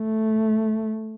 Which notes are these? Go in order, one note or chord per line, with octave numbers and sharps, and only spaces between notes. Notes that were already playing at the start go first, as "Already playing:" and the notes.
Already playing: A3